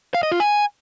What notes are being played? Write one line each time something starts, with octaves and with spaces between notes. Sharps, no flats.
F5
D#5
F4
G#5